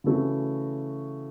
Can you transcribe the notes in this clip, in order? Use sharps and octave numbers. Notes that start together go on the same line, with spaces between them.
C#3 E3 A3 C#4 F#4